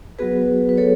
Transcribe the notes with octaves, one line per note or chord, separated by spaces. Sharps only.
F#3 B3 F#4 G#4 B4
B4
A4 C#5